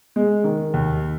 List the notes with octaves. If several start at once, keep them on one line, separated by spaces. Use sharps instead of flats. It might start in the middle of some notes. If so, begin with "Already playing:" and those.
G#3
D#3
D#2